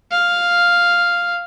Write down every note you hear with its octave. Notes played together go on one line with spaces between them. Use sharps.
F5